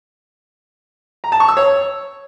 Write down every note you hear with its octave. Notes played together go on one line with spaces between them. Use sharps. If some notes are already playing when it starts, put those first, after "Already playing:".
A#5
A5
C#6
E6
C#5